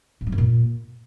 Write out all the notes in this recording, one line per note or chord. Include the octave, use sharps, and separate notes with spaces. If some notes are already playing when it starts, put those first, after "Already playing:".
G#2
F#3
F#2
A#2